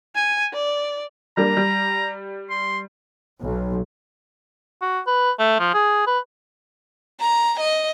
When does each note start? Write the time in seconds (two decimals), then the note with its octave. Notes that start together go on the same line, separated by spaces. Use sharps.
0.15 G#5
0.54 D5
1.37 G3 A#3 D4 A#5
1.57 G3
2.50 C6
3.40 B1
4.82 F#4
5.07 B4
5.39 A3
5.60 F3
5.74 G#4
6.07 B4
7.20 A#5
7.60 D#5